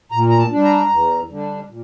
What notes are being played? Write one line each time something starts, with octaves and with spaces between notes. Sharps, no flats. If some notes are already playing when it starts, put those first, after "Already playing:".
A#2 A#5
A#5
A5
G3 D4
A#5
E2
D3 G3 D4
A#2